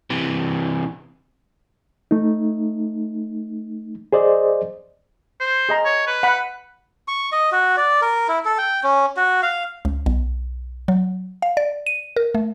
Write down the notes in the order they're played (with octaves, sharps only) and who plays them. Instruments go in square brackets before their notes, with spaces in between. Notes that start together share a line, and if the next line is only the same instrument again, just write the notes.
[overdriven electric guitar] C3 E3
[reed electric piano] A3 D#4
G#4 C5 D5 D#5
[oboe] C5
[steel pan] G#4 D#5 A#5
[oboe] C#5
B4
[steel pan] F#5 B5
[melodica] C#6
D#5
F#4
D5
A#4
E4
A4
G5
C#4
F#4
F5
[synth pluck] C#2
B1
F#3
F5
D5
D#7
A#4
A3